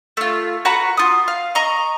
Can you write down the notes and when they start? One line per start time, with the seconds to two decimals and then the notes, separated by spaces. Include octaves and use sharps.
0.17 A3 F4
0.65 F#4 B4 F#5 A#5
0.97 F4 D#6
1.28 F5
1.55 D#5 A#5 C#6